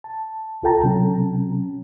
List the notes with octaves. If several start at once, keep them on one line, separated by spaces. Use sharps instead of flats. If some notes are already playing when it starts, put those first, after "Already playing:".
A5
C#2 F4 A4 G5 A5 A#5
C3 F#3 C#4